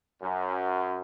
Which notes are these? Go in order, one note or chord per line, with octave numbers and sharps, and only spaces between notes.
F#2